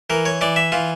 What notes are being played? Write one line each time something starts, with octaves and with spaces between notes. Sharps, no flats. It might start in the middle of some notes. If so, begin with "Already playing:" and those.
E3 A#4
C#5
E3 D5
E5
E3 F4